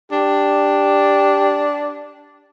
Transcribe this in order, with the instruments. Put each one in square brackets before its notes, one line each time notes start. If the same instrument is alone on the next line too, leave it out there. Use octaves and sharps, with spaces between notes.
[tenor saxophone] D4 [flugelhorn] G4